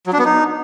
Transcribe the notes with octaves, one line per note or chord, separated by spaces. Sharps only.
F#3
D4
B3
D#4